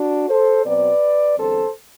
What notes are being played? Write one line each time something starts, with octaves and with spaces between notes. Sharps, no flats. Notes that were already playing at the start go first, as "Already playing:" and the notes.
Already playing: D4 F#4
A4 C5
B2 F#3 C4 B4 D5
E2 D3 G3 C4 A4 C5